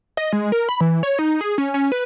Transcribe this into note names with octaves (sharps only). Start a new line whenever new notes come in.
D#5
G#3
A#4
B5
E3
C#5
D#4
G#4
C#4
C#4
B4